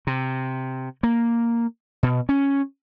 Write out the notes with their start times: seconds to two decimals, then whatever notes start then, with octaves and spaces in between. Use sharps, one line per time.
0.07 C3
1.03 A#3
2.03 B2
2.29 C#4